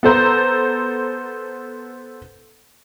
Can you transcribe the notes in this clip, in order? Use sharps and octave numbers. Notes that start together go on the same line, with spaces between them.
B3 A4 C5 A#5